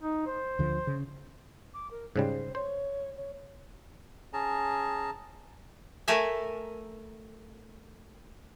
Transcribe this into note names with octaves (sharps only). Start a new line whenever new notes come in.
D#4
C5
D2 D3 F3
C#3
D6
A#4
G#2 C#3 G3 C5
C5 C#5
C#5
C#4 G#4 A5 A#5
A3 A#4 E5 G#5